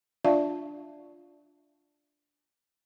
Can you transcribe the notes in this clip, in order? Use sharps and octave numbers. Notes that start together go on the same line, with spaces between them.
D4 F4 D5 E5 F5 A5